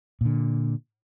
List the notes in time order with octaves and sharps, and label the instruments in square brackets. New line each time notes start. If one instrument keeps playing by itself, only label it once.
[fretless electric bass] A#2 D3